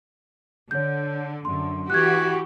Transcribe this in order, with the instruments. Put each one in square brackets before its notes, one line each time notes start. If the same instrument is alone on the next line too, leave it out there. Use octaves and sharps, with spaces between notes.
[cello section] D3 [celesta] C#5 G6
[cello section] F#2 D3 [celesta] C6
[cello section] E3 F#4 G4 [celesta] F#6 G#6